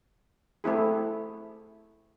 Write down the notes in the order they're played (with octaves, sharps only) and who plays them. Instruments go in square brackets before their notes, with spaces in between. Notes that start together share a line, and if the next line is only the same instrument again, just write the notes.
[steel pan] A3 C4 E4 G#4